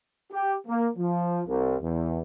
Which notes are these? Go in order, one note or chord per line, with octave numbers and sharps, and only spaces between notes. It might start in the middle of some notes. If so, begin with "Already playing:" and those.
G4
A#3
F3
C2
E2